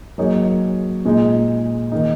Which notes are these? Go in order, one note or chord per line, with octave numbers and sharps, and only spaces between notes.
F#3 A#3 D#4 G#4 C#5
A#2 G#3 D#4
D#3 A#3 D#4